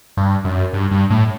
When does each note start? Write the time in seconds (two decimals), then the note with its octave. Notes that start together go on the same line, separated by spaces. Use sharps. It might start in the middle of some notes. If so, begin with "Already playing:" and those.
0.17 G2
0.45 F#2
0.73 G2
0.91 G2
1.10 A2